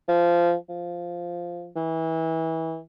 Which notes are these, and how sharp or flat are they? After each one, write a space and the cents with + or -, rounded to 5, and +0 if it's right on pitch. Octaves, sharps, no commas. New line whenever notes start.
F3 -15
F3 -5
E3 -25